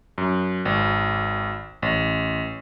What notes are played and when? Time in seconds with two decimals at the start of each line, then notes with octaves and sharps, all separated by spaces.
0.18 F#2
0.65 G#1
1.82 A1